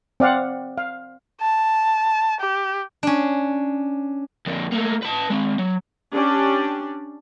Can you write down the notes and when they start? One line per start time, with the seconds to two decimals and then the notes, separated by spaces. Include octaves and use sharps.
0.20 C4 D5 F5 F#5
0.78 F5
1.41 A5
2.41 G4
3.03 C#4 D4
4.47 F2 A#3
4.72 A3 A#3
5.02 B4 A5
5.30 G#3 C4
5.59 F#3
6.13 C#4 D4 G4 D5